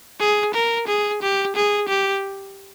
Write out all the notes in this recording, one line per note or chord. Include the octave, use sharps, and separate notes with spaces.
G#4
A#4
G#4
G4
G#4
G4